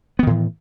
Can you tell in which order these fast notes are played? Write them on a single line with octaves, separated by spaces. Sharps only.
B3 D#3 A2 E3